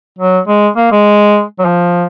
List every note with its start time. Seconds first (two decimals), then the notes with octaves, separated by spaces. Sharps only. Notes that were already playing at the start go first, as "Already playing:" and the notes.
0.18 F#3
0.48 G#3
0.76 A#3
0.92 G#3
1.59 F#3
1.65 F3